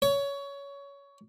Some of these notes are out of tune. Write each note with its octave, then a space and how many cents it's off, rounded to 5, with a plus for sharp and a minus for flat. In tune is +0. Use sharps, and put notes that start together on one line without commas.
C#5 +20